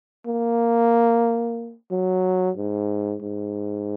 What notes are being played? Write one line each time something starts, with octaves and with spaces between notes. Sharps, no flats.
A#3
F#3
G#2
G#2